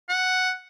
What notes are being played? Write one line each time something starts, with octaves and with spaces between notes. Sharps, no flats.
F#5